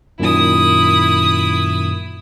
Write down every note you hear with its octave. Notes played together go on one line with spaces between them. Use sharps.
F#2 A#2 D#3 E4 D#6